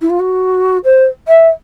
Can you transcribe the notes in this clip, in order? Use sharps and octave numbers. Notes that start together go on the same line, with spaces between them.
E4
F4
F#4
C5
E5